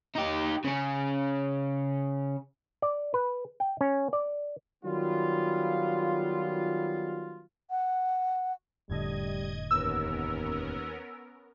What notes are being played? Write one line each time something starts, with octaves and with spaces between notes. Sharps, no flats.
D#4 G4
C#3 C#4
D5
B4
G5
C#4
D5
D#3 F#3 G3 B3 F4
F#5
F1 A2 D3 G3 D#5 G#6
D#2 B3 C#4 A#4 E6